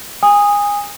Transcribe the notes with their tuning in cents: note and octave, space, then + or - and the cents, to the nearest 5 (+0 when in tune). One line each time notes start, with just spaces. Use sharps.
G#5 -25 D#6 +0